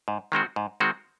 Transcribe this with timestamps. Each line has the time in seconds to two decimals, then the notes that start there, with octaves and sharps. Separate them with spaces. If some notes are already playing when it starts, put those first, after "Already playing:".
0.08 G#2
0.32 D#3 G#3 C4 F#4
0.56 G#2
0.80 D#3 G#3 C4 F#4